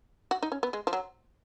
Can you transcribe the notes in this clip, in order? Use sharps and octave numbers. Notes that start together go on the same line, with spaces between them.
F#4
D#4
C#4
B3
G#3
F3
F#3